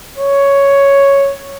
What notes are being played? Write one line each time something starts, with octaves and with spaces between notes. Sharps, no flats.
C#5